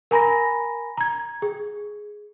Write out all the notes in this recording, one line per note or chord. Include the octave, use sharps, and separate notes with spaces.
A#4 G#5 A#5 B5 A#6
A#5 G#6
G#4